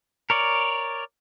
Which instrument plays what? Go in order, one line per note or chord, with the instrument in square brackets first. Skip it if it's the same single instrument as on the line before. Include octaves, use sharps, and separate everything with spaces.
[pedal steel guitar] A#4 C#5 D5